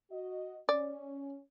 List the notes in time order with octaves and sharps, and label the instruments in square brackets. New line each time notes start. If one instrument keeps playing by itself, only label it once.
[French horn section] F#4 D#5
[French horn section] C#4 [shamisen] D5